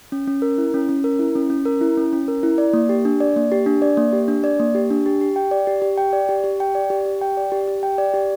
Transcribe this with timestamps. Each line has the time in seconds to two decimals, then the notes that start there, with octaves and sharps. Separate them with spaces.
0.12 C#4
0.27 C#4
0.42 A#4
0.58 E4
0.74 C#4
0.89 C#4
1.04 A#4
1.19 E4
1.35 C#4
1.50 C#4
1.65 A#4
1.81 E4
1.97 C#4
2.13 C#4
2.28 A#4
2.43 E4
2.58 D5
2.73 A#3
2.89 G4
3.05 D4
3.21 D5
3.36 A#3
3.52 G4
3.66 D4
3.82 D5
3.97 A#3
4.13 G4
4.28 D4
4.44 D5
4.60 A#3
4.75 G4
4.91 D4
5.06 G4
5.21 G4
5.36 G5
5.51 D5
5.67 G4
5.82 G4
5.98 G5
6.13 D5
6.29 G4
6.44 G4
6.60 G5
6.75 D5
6.90 G4
7.06 G4
7.21 G5
7.37 D5
7.52 G4
7.68 G4
7.83 G5
7.98 D5
8.14 G4